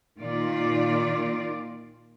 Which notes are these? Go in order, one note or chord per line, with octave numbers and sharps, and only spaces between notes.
A#2 D#3 F4 D5